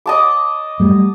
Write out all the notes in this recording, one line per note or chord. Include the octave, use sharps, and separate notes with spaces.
D#5 A5 D6
F#3 G3 A3